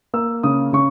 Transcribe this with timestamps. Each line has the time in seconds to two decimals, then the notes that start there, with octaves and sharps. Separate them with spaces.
0.13 A#3 E6
0.43 C#3 D#6
0.73 C#3 C#6